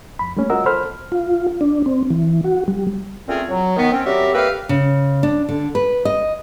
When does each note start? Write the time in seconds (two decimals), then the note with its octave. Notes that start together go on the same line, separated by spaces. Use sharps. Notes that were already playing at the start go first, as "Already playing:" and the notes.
0.19 F2 B5
0.37 G3 A3 A#3 C#4
0.50 F4 F#4 A#4 D#5 F#5 E6
0.66 A4 C5 B5 F6
1.12 F4
1.61 D4
1.86 C4
2.10 E3
2.44 F#4
2.68 G3
3.28 A#2 A3 C4 C#4 F4 G#4
3.49 F#3
3.77 D#3 B3
3.92 C4 C#4
4.06 F#3 G3 C4 G4 A#4 E5
4.34 A#3 G4 A4 B4 E5 F5
4.69 C#3
5.23 D4
5.49 D3
5.75 B4
6.05 D#5